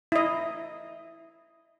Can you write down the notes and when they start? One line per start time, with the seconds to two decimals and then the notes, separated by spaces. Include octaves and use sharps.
0.12 E4 D#5